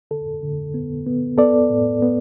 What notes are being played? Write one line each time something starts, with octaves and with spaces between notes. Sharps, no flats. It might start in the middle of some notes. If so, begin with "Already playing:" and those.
D3 A4
D3
B3
B3
B3 A4 D5
A2
B3